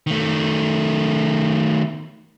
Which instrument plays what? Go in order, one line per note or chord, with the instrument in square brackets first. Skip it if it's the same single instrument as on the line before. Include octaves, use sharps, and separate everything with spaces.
[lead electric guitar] D#3 A3